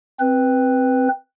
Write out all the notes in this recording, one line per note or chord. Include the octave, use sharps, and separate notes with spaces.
C4 B4